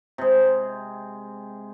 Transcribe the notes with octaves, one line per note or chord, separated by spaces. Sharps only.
C3 G#3